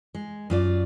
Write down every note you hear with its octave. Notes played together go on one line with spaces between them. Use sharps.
G#3
F#2 F4 D5